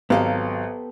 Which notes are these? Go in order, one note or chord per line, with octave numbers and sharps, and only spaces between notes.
G#1 F#3 B3 G4 A4 F5